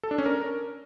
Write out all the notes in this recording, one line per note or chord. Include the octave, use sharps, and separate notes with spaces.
A4
D4
C#4
A#4